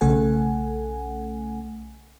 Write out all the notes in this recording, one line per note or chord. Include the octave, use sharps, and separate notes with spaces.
B1 C#3 A3 A4 F#5 G#5